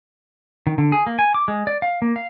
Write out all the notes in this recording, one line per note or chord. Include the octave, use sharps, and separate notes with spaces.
D#3
D3
G#4
A#3
G#5
D6
G#3
D5
F5
A#3
F5